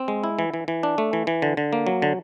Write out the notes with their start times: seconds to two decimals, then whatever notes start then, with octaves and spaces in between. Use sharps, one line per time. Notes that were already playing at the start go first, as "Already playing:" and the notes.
Already playing: C4
0.08 G#3
0.24 E4
0.39 E3
0.54 E3
0.68 E3
0.83 D4
0.98 A3
1.13 E3
1.27 E3
1.42 D3
1.57 D3
1.73 A#3
1.87 F#3
2.02 D3